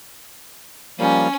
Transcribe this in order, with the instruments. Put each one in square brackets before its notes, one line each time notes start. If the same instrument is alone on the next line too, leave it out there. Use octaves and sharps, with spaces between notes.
[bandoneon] F3 G3 A#3 [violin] C#4